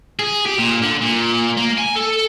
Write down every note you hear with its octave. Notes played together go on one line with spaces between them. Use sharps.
G#4
G4
A#2
D3
A#2
A#3
G#5
A4